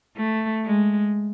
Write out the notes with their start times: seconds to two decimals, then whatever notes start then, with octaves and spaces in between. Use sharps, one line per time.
0.17 A3
0.65 G#3